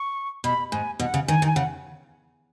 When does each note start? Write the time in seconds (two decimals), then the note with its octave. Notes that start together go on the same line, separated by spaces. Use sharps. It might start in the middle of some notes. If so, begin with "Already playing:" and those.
Already playing: C#6
0.44 B2 B5
0.72 G#2 G#5
1.00 B2 F#5
1.14 C#3
1.28 D#3 G#5
1.42 D#3
1.47 G#5
1.56 C#3 F#5